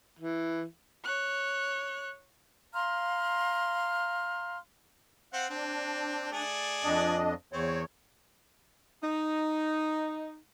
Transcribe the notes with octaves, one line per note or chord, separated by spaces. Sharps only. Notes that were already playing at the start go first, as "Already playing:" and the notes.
E3
C#5 F#6
F5 A#5 C6 F6
C4 F5 F#5
C4 D4
A3 G#4 D5
F2 D4 D#5
E2 C4 C#5
D#4